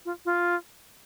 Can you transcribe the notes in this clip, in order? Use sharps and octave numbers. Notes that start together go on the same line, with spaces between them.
F4
F4